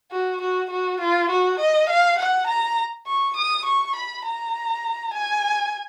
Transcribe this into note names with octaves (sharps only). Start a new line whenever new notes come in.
F#4
F#4
F#4
F4
F#4
D#5
F5
F#5
A#5
C#6
D#6
C#6
B5
A#5
G#5